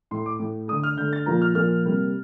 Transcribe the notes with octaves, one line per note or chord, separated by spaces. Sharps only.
A2 A3 C6
D6
A2 A3
D3 A3 D#6
F6
D3 A3 G6
A6
A#2 F3 A#3 A#5
F6
A#2 F3 A#3 F6
C3 G3 A#3